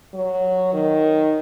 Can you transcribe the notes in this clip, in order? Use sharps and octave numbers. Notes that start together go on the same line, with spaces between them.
F#3
D#3